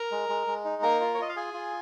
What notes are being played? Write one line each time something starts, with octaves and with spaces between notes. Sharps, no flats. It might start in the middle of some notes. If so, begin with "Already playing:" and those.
Already playing: A#4 A#5
G#3
G#3
G#3
D#4
A#3 A#4 A#5
F4
C#5
F4 D#5
F5
G#4 G#5
F4